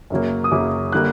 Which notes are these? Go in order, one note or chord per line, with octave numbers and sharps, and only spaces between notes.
F#2 C#3 F#3 A#3
D#6
F#2 C#3 F#3 A#3 D6
D3 G3 A#3 F#6